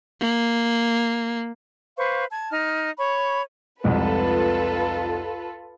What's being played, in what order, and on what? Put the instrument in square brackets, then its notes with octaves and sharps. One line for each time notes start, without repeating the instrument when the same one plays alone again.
[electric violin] A#3
[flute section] B4 C5 F5 C#6
A5 G#6
D#4 F6
C#5 B5 C#6
[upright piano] C2 F2 G#2 [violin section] F4 A4 B4